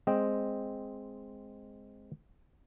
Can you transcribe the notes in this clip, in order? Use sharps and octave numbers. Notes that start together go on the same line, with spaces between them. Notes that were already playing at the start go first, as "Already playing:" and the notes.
G#3 C4 D#5 G5